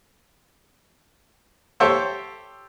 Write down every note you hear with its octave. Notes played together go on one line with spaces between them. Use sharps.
G4 A4 C5 C#5 E5